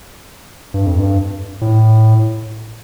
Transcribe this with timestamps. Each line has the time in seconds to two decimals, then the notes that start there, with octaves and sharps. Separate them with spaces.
0.74 G2
0.86 F2
0.99 G2
1.61 A2